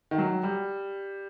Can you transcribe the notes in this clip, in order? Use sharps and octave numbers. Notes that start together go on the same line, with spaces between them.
D#3
F#3
G3